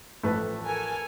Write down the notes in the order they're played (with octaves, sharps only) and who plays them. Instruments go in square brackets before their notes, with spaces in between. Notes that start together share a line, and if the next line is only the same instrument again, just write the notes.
[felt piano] A1 F2 A5 [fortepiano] A3 B4
[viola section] A4 A#4 G#5